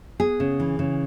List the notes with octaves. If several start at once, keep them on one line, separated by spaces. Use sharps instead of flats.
B3 G#4
C#3
E3
C#3